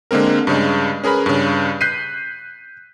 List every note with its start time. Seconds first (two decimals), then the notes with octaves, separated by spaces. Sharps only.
0.11 D3 G#3 A#3 C4 A#4
0.47 G2 C#3 G#3
1.04 C#4 G#4 A#4 B4 B5
1.26 G2 C#3
1.81 F#6 G6 B6 C7 D#7